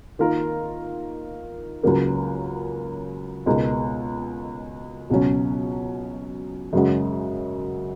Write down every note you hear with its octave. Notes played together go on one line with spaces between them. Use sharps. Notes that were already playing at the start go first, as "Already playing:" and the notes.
D#3 A#3 F4 A#4
C#2 C#3 F#3 A#3
C#2 B2 G#3 D#4 A#4
C#2 B2 F#3 C#4
F#2 C#3 G#3 C#4 F#4